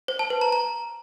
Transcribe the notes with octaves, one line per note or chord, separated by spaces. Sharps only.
C5
A5
B4
A#5
A#5